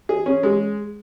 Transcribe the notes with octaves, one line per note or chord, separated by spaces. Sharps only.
G#4
C#4
G#3